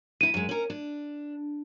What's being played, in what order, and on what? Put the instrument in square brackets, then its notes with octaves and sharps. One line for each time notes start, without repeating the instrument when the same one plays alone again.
[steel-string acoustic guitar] E2 E4 [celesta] D#7
[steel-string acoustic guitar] F#2 G#3
C#4 A#4
D4